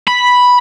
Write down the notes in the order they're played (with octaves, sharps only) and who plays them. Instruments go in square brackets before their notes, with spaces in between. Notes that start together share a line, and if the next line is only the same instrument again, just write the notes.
[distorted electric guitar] B5